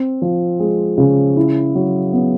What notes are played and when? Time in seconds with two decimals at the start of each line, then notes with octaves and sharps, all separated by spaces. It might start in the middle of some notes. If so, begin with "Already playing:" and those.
Already playing: C4
0.22 F3
0.60 G#3
0.98 C#3
1.37 E4
1.75 F#3
2.13 B3